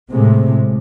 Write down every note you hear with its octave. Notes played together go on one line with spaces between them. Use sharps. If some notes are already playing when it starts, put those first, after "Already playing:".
A2 C3 G#3